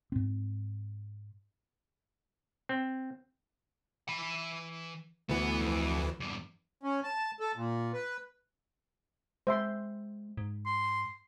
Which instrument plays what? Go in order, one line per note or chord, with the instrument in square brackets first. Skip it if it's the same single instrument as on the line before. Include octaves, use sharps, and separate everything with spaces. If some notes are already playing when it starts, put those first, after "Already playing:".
[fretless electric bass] G#2 C4
[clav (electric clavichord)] C4
[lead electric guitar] E3 B5
[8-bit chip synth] D2 E3 [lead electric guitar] B3
[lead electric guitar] F2
E2 G2
[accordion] C#4
A5
A4
A#2
B4
[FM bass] G#3 [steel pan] C5 E5 C6
[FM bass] G#2
[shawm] C6